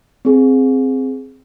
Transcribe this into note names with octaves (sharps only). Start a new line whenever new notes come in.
C4 G#4